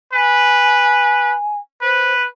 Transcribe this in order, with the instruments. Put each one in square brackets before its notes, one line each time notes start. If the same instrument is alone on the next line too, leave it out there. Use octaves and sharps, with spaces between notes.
[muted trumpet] B4 [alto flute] G#5
[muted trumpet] B4 [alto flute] C5